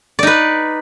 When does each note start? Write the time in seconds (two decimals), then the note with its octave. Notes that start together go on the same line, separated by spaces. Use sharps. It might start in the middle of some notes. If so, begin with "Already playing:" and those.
0.19 D5
0.23 D#4
0.27 B4